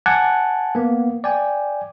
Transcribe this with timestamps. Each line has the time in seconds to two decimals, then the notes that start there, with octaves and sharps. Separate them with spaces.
0.06 F#5 G#5 A5 D6 F#6 G#6
0.75 A#3 B3
1.24 D5 G5 G#5